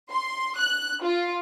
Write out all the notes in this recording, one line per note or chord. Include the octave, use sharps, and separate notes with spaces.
C6
F#6
F4